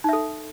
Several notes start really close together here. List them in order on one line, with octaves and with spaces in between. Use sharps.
D#4 E5 A4